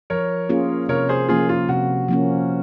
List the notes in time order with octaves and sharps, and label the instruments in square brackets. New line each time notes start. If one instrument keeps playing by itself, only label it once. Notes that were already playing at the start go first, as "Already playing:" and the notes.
[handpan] F3 [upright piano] A#4 C#5
[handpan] A#3 C#4 F4 G#4
[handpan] C3 [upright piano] A#4 C#5
[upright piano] G#4 C5
[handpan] F3 A#3 C#4 [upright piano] F4 G#4
[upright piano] F4
[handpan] C3 [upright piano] F#4
[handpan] F3 A#3 C#4